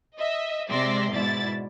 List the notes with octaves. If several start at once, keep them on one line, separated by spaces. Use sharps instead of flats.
D#5 E5
C3 G#3 D5 E5 C6 A#6
G#2 B2 E4 D5 A6